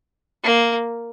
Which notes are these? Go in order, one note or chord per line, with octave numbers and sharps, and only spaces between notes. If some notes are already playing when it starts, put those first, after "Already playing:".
A#3